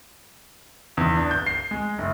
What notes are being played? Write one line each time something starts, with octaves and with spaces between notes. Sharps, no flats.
E2
D4
G6
C7
G#3
F#1